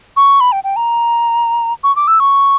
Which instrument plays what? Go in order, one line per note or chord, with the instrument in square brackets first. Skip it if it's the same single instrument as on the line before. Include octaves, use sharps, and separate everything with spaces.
[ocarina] C#6
B5
G5
G5
A#5
C#6
D6
E6
C#6